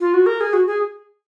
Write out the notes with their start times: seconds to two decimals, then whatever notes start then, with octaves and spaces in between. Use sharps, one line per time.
0.01 F4
0.14 F#4
0.26 A#4
0.41 G#4
0.53 F#4
0.67 G#4